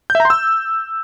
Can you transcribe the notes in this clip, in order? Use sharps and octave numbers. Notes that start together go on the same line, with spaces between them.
G6
E5
A#5
C6
E6